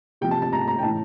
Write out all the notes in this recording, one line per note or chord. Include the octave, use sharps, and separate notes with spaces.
C3 F3 G5
A5
A5
A#5
A#5
G5
A2 E3 A5